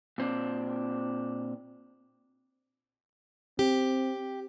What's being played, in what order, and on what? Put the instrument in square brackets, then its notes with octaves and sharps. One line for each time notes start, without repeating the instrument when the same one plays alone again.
[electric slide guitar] A#2 C4 D4
[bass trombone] C4 [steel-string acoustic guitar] G4